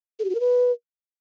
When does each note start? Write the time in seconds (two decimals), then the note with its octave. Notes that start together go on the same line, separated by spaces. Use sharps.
0.19 A4
0.24 G4
0.30 F#4
0.35 A#4
0.40 B4